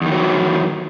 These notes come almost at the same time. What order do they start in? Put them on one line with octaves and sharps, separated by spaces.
E2 D#3 F#3 E3